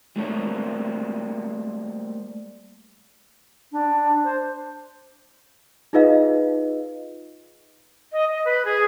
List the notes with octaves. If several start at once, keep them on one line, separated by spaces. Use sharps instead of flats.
G3 A3 A#3 C4 A4 C#5
D4
C5
D#4 F4 G#4 B4 D#5 F5
D#5
D#5
B4
G#4